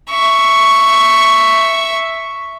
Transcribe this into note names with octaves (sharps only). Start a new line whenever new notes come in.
E5 C#6